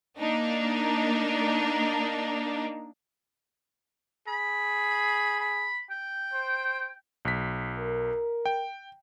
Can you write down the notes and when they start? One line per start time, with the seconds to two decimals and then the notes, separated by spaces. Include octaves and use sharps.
0.19 A#3 D4 D#4
4.28 G#4 B5
5.40 B5
5.91 G5
6.33 C5
7.25 B1 B6
7.78 A#4
8.46 G5